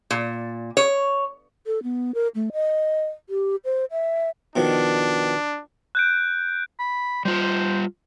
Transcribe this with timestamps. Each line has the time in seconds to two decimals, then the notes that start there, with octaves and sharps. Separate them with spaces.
0.11 A#2
0.77 C#5
1.66 A4
1.83 B3
2.14 A#4
2.35 A3
2.53 D#5
3.29 G4
3.65 C5
3.91 E5
4.56 B2 D#3 F3 D4
5.95 F#6 G6 D7
6.80 B5
7.25 G3 F4 C5